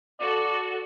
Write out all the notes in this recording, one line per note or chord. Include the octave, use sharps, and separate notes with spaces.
F#4 A4 D5